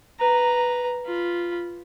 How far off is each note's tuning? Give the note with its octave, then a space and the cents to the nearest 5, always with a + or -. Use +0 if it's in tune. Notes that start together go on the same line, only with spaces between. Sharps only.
B4 +0 A#5 +0
F4 -5 B5 -10